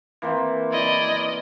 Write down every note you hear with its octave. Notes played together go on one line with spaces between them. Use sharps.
E3 A#3 C4
E4 D5 D#5